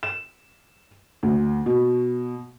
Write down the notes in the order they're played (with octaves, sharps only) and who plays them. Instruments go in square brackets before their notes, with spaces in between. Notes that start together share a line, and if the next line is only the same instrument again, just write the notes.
[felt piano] E7
D2
B2